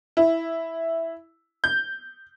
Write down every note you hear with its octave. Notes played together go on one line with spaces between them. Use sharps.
E4
G6